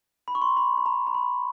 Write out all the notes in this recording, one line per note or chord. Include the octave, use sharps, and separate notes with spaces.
B5
C#6
C6
B5
B5
A#5
A#5
B5